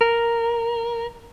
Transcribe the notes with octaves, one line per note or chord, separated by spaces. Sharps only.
A#4